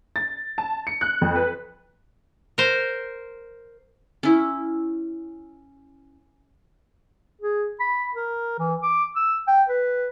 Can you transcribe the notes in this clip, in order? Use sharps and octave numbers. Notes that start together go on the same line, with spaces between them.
A6
A5
C#7
F#6
F2
B4
A#4 C5
C#4 E4
G#4
B5
A#4
E3
D6
E6
G5
B4